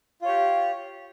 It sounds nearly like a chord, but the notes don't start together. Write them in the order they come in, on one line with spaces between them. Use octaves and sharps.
F4 C#5 G4